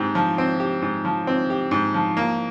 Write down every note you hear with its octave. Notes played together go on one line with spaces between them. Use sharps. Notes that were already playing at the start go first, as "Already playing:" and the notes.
Already playing: G#2 C4 G4
F3
C4
G4
G#2
F3
C4
G4
G#2
F3
A#3